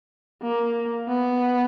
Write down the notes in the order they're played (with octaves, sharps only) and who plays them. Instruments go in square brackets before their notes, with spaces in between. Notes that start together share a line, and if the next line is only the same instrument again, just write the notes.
[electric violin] A#3
B3